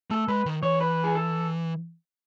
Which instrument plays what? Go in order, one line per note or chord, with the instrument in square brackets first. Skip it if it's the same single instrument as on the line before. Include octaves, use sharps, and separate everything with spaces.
[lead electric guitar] A3 [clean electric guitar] A4
[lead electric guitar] G#3 [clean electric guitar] B4
[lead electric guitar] D#3
[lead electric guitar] E3 [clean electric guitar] C#5
[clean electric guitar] B4
G#4
A4